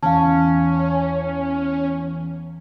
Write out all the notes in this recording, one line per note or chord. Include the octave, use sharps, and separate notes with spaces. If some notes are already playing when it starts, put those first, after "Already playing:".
E2 C#4 F5 A5